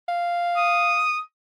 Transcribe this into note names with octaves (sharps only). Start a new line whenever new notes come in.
F5
D#6